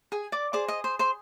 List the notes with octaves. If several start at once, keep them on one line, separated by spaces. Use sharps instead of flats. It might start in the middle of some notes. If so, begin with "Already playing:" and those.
G#4 G#5
D5 D6
G#4 C5 D5 D6
D#5 D#6
C5 C6
C5 C6